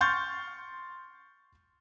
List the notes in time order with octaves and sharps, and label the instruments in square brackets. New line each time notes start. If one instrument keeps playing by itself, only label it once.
[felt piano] C6 C#6 F6 G6 A6